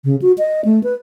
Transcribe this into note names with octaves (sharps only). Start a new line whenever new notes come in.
C#3
F#4
D#5
A3
B4